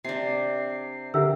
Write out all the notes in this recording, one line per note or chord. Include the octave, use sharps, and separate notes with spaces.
C3 D4 C7
D3 G4 A#4 E5 E6